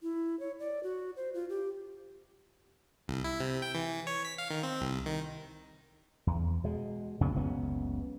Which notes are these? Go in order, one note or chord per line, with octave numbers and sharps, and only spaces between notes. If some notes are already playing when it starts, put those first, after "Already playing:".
E4
C#5
D5
F#4
C5
F4
G4
C2
E4
C3
G5
E3
C#5
B6
F5
D#3
C4
C2
D#3
E2
B2 G#3
F2 C#3 A#3 B3
F#1 C#2 B3 C#4